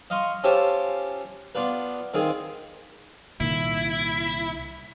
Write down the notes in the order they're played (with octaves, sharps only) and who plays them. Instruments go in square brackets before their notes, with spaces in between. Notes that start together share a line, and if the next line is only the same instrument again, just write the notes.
[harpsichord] D#5 F5 C6 C#6
C#4 F4 G4 C5 E5 A5
B3 D4 F4 B4
D#3 C4 F4 G#4
[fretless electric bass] C2 A#2 D#3 [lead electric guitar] E4